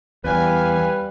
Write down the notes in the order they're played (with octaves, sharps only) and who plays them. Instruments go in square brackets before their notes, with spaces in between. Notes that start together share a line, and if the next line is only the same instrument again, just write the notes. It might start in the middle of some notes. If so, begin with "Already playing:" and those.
[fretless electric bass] E2 [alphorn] G3 [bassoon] B4 [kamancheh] F5 G#5